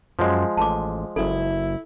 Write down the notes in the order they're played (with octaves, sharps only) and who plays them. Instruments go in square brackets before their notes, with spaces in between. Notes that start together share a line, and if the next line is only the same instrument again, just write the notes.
[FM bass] F#2 [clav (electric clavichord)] F3 G#3
[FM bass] A1 [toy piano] A5 D6
[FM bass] F#1 [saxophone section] E4 [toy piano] A4